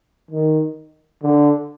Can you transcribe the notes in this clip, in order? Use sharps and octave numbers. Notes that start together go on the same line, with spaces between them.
D#3
D3